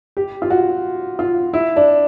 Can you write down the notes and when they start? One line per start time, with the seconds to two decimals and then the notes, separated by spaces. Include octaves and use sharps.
0.17 G4
0.42 F4
0.50 F#4
1.19 F4
1.53 E4
1.76 D4